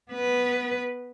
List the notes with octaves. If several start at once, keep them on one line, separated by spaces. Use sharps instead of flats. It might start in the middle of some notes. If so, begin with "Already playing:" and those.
B3 B4